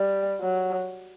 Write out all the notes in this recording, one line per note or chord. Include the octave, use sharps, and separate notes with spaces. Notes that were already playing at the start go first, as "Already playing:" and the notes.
Already playing: G3
F#3